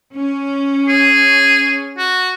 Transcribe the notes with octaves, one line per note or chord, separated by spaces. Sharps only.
C#4
G#4
F#4